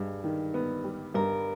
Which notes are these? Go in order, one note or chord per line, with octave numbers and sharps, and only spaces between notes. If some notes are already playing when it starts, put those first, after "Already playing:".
Already playing: G2 G#4
D#3
B3
G3
G2 A#4